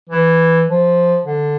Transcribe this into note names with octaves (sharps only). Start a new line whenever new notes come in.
E3
F3
D3